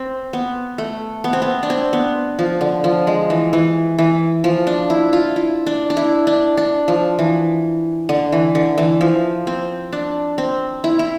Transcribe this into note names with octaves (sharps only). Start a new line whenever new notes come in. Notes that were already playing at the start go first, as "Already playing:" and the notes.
Already playing: C4
B3
A3
B3
C4
B3
D4
C4
B3
F3
D3
F3
G#3
E3
E3
E3
F3
D4
E4
F4
E4
D4
D4
E4
D4
D4
F3
E3
D3
E3
D3
E3
F3
C4
D4
C4
E4
E4